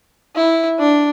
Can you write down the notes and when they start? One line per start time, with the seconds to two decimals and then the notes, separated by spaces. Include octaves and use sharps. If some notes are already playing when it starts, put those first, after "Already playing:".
0.36 E4
0.79 D4